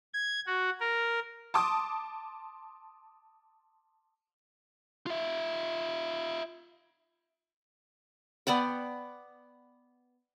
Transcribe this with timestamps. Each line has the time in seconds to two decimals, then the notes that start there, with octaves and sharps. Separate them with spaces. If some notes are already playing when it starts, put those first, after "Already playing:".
0.14 G#6
0.47 F#4
0.81 A#4
1.54 A5 C6 D6 D#6
5.06 F4 E5
8.47 B3 D5 F#5 G5